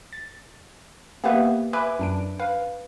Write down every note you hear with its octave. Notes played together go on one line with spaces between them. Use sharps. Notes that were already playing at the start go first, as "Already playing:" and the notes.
A6
A#3 B3 G4 B4 E5 F#5
B4 E5 G#5 B5 D6
F#2 D4 D7
B4 F5